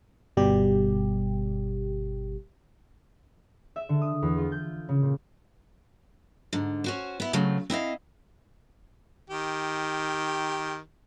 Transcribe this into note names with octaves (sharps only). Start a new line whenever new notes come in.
G1 B2 G3 G4
E5
D3
D#6
E2
F4
G6
C#3
A#2
G#2 D3
C#4 F#4 C5
B3 E4
C#3 F#3 A3 C4
C4 E4 D#5 F5
D#3 G4